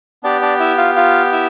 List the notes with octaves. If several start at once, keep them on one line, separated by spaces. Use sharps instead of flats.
B3 D4 G4 D5
D4 D5
E4 E5
F4 F5
F4 F5
E4 E5